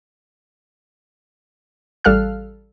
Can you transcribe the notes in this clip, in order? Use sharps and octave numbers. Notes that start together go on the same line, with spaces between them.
A1 G3 A4 F5 F6 F#6